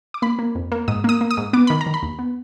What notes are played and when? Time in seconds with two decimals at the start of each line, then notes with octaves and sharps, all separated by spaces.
0.14 D6
0.22 A#3 B5
0.39 A#3
0.55 F2
0.72 A#3
0.88 G#2 D#6
1.04 A#3 D#6
1.21 A#3
1.31 D#6
1.37 G#2
1.53 B3 D6
1.67 D#3 B5
1.81 A#5
1.86 D#3
1.94 B5
2.02 D#2
2.19 B3